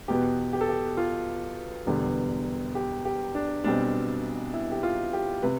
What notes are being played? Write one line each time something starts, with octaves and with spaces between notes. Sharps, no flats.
E2 B2 B3 G4
G4
A4
G4
F4
E1 E2 D3 G3 B3
G4
G4
D4
B1 B2 G3 C4 D4
E4
G4
F4
G4
C3 B4